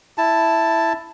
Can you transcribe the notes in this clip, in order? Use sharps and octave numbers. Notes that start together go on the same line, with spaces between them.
E4 A5